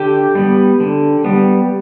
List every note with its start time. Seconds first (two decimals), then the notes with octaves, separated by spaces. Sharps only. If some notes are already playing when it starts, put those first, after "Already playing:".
Already playing: D3 G4
0.35 G3 B3
0.80 D3
1.24 G3 B3